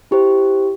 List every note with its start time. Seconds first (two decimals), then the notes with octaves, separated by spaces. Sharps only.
0.11 E4 G4 C5